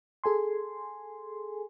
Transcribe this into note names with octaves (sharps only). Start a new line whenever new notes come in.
G#4 A4 G#5 C6